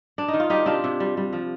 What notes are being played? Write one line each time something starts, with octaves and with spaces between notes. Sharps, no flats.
D4
D#4
D#3
F4
G3 D#4 G4
C3 D4 F4
C3
G3
G3
F3